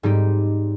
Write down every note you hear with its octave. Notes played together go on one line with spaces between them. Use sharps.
G#2 G3 C4 D#4 G4